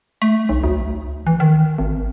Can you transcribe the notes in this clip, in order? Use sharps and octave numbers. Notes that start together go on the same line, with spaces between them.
A3
B1
D2
E3
D#3
G#1